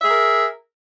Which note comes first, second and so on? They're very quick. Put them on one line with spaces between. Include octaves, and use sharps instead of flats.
E5 G#4 A#4